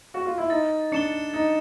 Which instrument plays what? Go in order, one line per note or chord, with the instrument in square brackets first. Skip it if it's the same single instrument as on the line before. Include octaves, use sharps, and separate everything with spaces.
[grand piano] F#4
F4
E4
[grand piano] D#4 [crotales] A6
[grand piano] D4 [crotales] C#7 E7 G7
[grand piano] D#4 [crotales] A6